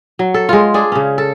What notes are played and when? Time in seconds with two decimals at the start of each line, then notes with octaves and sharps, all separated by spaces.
0.19 F#3
0.34 A4
0.49 G#3 F4
0.74 D4 G#4
0.92 C#3 C#4
1.18 A4